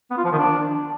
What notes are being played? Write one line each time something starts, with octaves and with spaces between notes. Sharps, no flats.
B3
F4
F3
D#3
D4